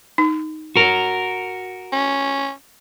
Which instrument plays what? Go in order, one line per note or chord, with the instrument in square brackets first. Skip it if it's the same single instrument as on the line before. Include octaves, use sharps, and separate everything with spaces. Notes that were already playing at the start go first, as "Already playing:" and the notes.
[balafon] D#4
[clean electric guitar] F#4 A#4
[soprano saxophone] C#4